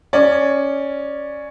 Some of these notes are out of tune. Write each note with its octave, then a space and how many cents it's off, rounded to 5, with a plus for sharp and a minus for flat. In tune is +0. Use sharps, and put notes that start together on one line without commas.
C#4 +0 D5 +10